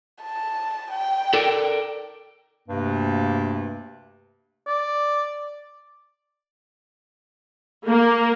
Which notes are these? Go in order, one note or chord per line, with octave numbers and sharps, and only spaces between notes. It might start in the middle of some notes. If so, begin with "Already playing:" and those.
A5
G5
A4 A#4 D5
D2 G2 C3 A#3
D5
A#3